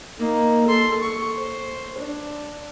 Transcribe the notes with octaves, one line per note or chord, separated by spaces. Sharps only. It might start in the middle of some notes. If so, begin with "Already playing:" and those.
A#3 D#4
A4 C6
C#6
C5
D4